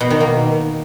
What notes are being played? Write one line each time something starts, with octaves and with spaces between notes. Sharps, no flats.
B2
D#3
A#3